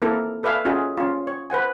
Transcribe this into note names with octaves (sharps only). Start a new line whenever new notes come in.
A#3 C4 E4 A4 A#4
A4 B4 D5 E5 F5 G#5
C#4 F4 F#4 G#4 D#5 E5
C#4 F4
C#5
B4 C5 F#5 G#5